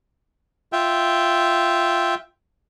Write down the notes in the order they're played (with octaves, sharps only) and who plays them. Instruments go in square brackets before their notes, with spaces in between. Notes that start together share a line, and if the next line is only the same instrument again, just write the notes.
[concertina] F4 E5 G5